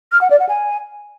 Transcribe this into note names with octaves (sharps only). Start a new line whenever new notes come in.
F6
F#5
D5
F#5
G#5